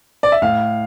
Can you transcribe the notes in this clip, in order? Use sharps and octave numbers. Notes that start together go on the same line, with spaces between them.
D5
E5
A2 F5